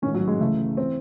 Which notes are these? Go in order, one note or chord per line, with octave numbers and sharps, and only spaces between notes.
A1 G#2 D#3 C#4
F#3
G#3
C#2 C#3 E3 A3
E3 C4